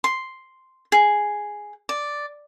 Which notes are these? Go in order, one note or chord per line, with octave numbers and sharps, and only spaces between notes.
C6
G#4
D5